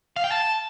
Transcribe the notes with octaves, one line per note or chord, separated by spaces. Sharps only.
F5
G5
A5